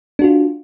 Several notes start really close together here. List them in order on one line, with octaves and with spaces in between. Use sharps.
D4 F#4 F4